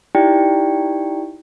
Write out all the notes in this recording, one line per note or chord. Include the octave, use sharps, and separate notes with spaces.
D#4 E4 G4 D5 G5